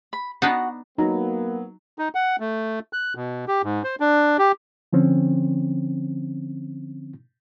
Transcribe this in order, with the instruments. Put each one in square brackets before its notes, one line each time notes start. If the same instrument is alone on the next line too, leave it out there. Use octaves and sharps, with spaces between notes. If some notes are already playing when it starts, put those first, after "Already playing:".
[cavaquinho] B5
[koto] B3 D4 D#4 [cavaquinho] F#4
[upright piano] F#3 [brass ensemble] A#3 B3 [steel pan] D#4 A#5
[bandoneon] D#4
F#5
A3
F#6
B2
G4
G#2
C5
D4
G4
[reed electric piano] D3 F3 C4 C#4